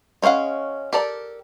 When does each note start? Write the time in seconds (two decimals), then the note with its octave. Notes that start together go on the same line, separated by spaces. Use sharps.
0.22 G#3 C#4 C5 F5 F#5
0.93 G4 A4 A#4 D5